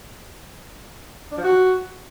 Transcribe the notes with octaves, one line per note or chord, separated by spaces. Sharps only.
D4
F3
F#4